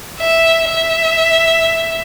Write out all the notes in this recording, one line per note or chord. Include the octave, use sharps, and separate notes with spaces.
E5
E5